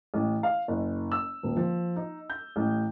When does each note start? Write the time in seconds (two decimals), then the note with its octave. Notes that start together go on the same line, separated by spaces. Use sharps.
0.14 A1
0.43 F5
0.68 F#1
1.12 E6
1.43 D#1
1.57 F3
1.96 D#4
2.30 G6
2.56 A1